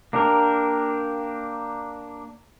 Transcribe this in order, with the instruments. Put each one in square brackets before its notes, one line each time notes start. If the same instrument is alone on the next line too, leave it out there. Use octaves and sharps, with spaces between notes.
[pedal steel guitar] A#3 D4 G4 A#4